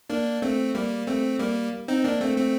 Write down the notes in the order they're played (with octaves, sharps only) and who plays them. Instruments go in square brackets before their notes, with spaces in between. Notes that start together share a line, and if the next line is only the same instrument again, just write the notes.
[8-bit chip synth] A#3 D4
A3 C4
G3 A#3
A3 C4
G3 A#3
C4 D#4
A#3 D4
A3 C4
A3 C4